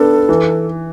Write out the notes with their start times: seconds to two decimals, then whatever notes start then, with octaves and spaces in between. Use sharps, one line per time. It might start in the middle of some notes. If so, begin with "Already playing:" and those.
Already playing: B3 D4 A4
0.29 E3